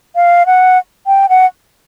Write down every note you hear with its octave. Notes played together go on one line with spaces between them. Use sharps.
F5
F#5
G5
F#5